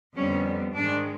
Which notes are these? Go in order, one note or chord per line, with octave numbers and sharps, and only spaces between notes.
F2 D3 G3 B3 C#4
G#2 D#3 G#3 D4